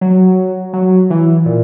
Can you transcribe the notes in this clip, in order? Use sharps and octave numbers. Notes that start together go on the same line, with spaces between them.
F#3
F#3
E3
A#2